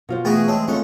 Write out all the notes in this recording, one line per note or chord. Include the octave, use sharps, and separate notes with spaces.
B2 F4 C5
E3 A3 B3 F#4 G#4 A#4
G#3 C4 C#5 A5
C#3 G#3 A3 C4 C#4 F4 A4 F#5